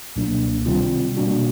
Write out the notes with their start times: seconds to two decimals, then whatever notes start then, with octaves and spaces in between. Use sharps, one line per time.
0.16 C#2 B2 F#3 A#3 D4
0.66 C3 D#3 G3 C4 F4
1.17 B2 G3 A#3 D4 F#4